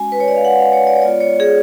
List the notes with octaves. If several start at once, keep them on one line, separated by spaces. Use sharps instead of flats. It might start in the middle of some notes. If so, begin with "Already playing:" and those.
Already playing: G#3 C#4 F#4 G#5
B4
C#5
D5
F5
F#5
F5
C#5
D5
C#5
G#3 B3 F4 D5
C#5
G#4